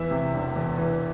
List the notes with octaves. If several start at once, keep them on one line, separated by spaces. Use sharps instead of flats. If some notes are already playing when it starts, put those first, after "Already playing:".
Already playing: E2 E3 E5
C3
E1
E2
E3